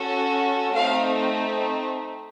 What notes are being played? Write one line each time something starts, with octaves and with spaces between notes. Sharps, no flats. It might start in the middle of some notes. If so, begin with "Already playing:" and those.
Already playing: C#4 F#4 A4
A3 C4 D#4 F5